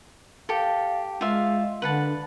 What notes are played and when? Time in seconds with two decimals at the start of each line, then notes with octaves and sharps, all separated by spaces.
0.49 G4 A4 F5
1.21 G#3 F4 E5 F5
1.82 D3 B4 F#5 A5